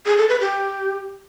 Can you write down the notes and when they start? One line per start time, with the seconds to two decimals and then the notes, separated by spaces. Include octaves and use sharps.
0.06 G#4
0.18 A4
0.29 B4
0.41 G4